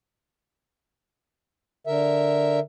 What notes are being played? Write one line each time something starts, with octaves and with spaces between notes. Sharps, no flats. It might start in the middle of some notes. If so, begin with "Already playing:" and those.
D3 A#4 E5